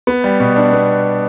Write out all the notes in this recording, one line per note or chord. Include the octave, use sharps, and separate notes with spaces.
B3
G3
B2
D4
B3